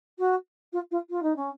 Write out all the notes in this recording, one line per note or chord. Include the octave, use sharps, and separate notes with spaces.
F#4
F4
F4
F4
D#4
C#4